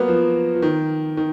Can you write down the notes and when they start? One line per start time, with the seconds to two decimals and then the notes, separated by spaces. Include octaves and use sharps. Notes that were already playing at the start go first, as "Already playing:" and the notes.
Already playing: F#3 A#3 B3
0.08 F3
0.55 F3
0.62 D#3
1.17 D#3